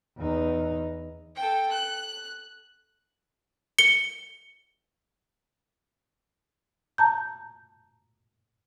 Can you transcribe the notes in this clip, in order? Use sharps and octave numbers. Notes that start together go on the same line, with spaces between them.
E2 D#4
A4 G5
F#6
C#7 G7
A5 A#5 G6